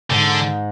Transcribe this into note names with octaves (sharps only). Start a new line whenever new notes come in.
G#2 D3